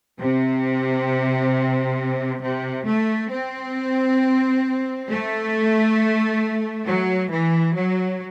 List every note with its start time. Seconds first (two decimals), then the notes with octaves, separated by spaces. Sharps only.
0.20 C3
2.42 C3
2.86 A3
3.31 C4
5.09 A3
6.86 F#3
7.30 E3
7.75 F#3